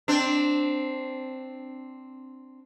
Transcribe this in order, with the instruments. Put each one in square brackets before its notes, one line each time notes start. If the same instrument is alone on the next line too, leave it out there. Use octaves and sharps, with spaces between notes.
[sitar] C4 D4